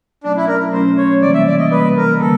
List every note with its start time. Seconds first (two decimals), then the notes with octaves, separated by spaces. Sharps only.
0.24 B2 F#3 A3 C#4 D4
0.36 E4
0.48 A#4
0.73 B2 F#3 A3 C#4 C5
0.98 C#5
1.22 C3 E3 G3 A#3 D5
1.34 E5
1.47 D5
1.59 D#5
1.71 C3 E3 G3 A#3 B4
1.97 A#4
2.20 D3 G3 A#3 A4